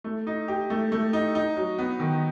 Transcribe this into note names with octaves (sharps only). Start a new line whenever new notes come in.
A3
D#4
G4
A3
A3
D#4
D#4
F#3
B3
D#3